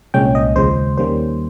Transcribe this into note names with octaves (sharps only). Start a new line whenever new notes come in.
C2 A#2 G#3 C#4 G5
D#5
D#2 C#3 F3 G#3 C5
D#2 D#3 G3 A#3 C#4 C5